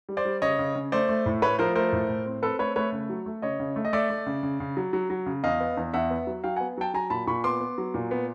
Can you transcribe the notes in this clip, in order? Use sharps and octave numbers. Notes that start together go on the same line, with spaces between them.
G3
C5 D5
G3
C#3 C#5 D#5
C#3
C#3
A3 C5 D5
A3
A2
A3 B4 C#5
F3 A#4 C5
A3 A#4 C5
A2
A2
C4
C4 A4 B4
A3 B4 C#5
A3 B4 C#5
C#3
F#3
A3
C#3 C#5 D#5
C#3
A3
D#5
A3 D5 E5
A3
C#3
C#3
C#3
F#3
F#3
F#3
C#3
E2 D#5 F5
B3
E2
E2 E5 F#5
B3
F#3
F#3 F5 G5
B3 F#5 G#5
F#3 G5 A5
F#3 G#5 A#5
A#2 A5 B5
A#2 B5 C#6
B3 C6 D6
B3
F#3
A#2
B3